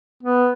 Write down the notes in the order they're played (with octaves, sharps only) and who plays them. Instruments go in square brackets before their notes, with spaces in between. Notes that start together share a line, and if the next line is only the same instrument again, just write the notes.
[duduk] B3